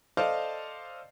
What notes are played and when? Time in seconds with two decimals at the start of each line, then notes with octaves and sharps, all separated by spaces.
0.17 A4 C5 D5 D#5 F5 A5